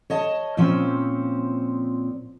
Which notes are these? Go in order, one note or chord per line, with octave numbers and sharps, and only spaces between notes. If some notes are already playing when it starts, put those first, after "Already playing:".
C#5 D#5 A5
A#2 F3 C4 C#4